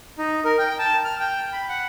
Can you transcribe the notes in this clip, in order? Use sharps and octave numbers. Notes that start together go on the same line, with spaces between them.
D#4
A#4
G5
A5
F6
G5
B5
F#5